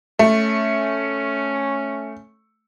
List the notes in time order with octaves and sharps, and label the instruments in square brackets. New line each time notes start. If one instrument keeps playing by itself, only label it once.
[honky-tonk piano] A3 [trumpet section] C#4